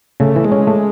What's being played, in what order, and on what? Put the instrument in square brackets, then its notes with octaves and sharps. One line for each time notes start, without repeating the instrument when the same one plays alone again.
[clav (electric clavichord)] C#3 [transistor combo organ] A3
[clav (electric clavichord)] E3
[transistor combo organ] G#3
[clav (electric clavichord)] C#4
A3